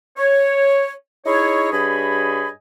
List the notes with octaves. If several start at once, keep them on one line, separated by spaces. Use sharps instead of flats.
C#5
D#4 E4 G#4 C#5
G2 G#4 C#5 D#5 G#5 B5